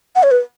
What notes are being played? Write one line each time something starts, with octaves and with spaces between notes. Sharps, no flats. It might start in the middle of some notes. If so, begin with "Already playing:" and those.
F#5
C#5
B4